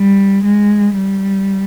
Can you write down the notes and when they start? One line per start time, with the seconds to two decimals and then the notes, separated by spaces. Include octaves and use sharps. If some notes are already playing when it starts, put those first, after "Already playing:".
Already playing: G3
0.45 G#3
0.96 G3